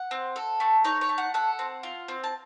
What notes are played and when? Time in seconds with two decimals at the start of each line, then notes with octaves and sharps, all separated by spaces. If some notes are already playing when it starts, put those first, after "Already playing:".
Already playing: F#5
0.11 C4
0.36 A4
0.60 A3
0.84 D#4 C#5
1.01 C#5
1.09 A3
1.18 F#5
1.34 A4 F#5
1.59 C4
1.83 F4
2.08 C4
2.24 A5